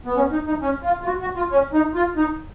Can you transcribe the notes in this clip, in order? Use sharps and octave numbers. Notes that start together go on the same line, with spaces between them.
B3
C#4
D#4
D#4
C#4
F4
F4
F#4
F#4
F4
C#4
D#4
F4
D#4